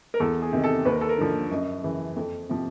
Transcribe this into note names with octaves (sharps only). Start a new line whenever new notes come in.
A#4
E2 A4
G#4
C3 D#3
A4
D#2 B4
A#4
A4
A#4
D3 F3
F#2 D#5
C#3 E3
F2
C3 F3